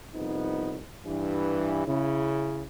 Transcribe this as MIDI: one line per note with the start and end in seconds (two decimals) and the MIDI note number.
0.14 0.78 36
0.14 0.78 41
0.14 0.78 59
0.14 0.78 63
1.05 1.84 43
1.05 1.84 52
1.87 2.64 49
1.87 2.64 64